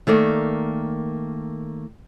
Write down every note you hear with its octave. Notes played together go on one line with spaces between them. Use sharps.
D#3 A3 A#3 D5